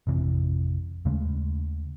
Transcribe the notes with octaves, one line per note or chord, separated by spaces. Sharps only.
A1 F2 C3 E3
D#2 C#3 G#3 A3